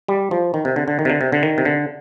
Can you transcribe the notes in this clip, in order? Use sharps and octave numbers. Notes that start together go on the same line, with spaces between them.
G3
F3
D#3
C3
D3
D3
D#3
C3
D3
C3
D3
D#3
C3
D3